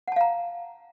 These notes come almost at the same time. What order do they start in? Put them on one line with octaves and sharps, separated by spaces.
F#5 A5 F5 A#5